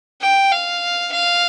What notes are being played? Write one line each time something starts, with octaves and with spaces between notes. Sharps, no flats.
G5
F5
F5